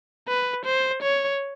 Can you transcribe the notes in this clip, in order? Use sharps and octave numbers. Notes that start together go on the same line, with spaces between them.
B4
C5
C#5